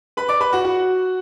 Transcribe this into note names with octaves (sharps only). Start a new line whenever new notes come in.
B4 B5
D5 D6
B4 B5
F#4 F#5
F#4 F#5